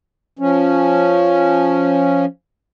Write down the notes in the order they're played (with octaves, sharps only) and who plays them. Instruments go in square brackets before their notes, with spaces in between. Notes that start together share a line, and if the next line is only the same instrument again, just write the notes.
[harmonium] F3 C#4